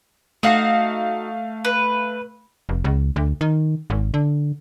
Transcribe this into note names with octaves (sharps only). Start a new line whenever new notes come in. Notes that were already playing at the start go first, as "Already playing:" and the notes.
A3 D#4 F#4 F5 C7
B4
F1
C#2
D2
D#3
G#1
D3